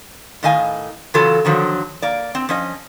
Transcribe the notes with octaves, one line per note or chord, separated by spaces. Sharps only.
A2 D#3 D#5 F5 G#5
C#3 E3 F#3 F4 A4
D3 D#3 F3 F#3
A#3 D5
C4
F3 C#4 D#5